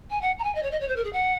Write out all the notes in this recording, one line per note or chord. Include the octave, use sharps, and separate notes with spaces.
G#5
F#5
A#5
G#5
D#5
C#5
D#5
C#5
C5
A#4
G#4
F#5